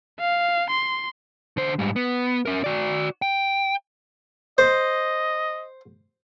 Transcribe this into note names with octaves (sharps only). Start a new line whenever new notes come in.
F5
C6
D3 C5
G#2 G3
B3
C#4 A#4
F#4 D5
G5
C5 D#5